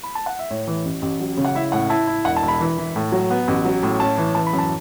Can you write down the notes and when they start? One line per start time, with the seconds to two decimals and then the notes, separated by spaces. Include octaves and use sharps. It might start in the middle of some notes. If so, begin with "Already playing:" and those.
0.04 B5
0.15 A5
0.26 F#5
0.39 E5
0.51 A2 C#5
0.67 E3
0.85 A1
1.02 A1
1.20 F#3
1.37 C#3
1.45 F#5
1.55 E4 E5
1.72 A2 F#5
1.90 E4 A5
2.07 E4
2.25 E1 F#5
2.36 A5
2.42 E1
2.48 B5
2.60 E3
2.78 E3
2.96 A2
3.12 F#3
3.30 B3
3.48 A1
3.65 F#3
3.83 A2
4.00 C#4 A5
4.18 E3
4.35 E3 A5
4.47 B5
4.53 F#2
4.58 A5